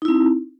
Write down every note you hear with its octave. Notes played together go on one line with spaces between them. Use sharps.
C4 D#4 E4